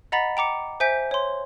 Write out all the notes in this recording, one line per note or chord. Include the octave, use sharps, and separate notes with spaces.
D#5 F#5 A#5 B5 A6 B6
G5 A#5 D6 C#7
C5 E5 G#5 G6 B6 D7
C#5 C6